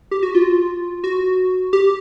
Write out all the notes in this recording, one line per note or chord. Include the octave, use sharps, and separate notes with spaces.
G4
F#4
F4
F#4
G4